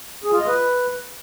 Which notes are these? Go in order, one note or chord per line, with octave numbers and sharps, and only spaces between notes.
G#4
F4
D#5
B4